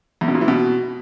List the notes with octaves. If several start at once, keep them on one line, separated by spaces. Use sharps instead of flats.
E2
B2
A#2
E3
B2